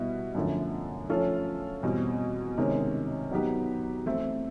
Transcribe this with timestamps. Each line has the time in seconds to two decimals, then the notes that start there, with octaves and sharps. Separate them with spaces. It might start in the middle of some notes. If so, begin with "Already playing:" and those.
Already playing: B2 G3 B3 E4
0.35 F#2 D3 F3 A3
1.09 F3 A3 C#4 F4 A4
1.83 E2 B2 G3 C4
2.57 C3 D#3 G#3 C#4
3.31 F#3 B3 D#4 G4
4.05 E3 A3 C4 E4